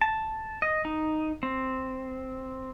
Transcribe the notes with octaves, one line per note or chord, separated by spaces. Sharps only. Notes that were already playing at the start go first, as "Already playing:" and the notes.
A5
D#5
D#4
C4